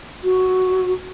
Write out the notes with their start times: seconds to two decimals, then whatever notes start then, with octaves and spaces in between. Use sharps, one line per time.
0.24 F#4